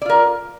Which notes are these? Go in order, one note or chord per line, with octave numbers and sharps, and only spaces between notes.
F4 A#4 D5